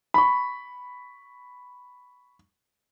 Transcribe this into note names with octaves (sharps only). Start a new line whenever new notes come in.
B5 C#6